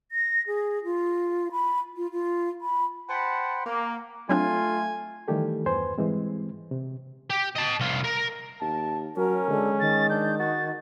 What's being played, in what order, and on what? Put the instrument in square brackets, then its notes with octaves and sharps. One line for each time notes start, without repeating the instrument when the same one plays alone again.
[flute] A#6
G#4
F4
B5
F4
F4
B5
[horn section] C5 F#5 G5 A5 B5
A#3
[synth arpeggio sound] F#3 C4 D4 [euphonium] A3 [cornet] F4 [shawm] G#5
[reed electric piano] D#3 E3 G3 A3 G4 A4
E2 G2 B4 C5 G#5 C6
G#2 E3 G3 G#3 C4
C3
[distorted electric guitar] G4
D#5 A5
C2 F4
A#4
[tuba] D#2 [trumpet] A5
[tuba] F#3 [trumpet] C#4 [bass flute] A#4
[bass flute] D3 [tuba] G#3
[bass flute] D#3 [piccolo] A6
[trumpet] D4 [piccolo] G6
[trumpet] F#4 [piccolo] A6